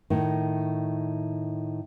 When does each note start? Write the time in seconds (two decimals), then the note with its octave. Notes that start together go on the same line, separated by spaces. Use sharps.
0.10 A2 D#3